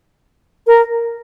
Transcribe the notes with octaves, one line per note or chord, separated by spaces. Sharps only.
A#4